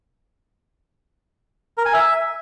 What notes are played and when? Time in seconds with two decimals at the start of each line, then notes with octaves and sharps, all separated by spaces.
1.78 A#4
1.86 G#5
1.93 E5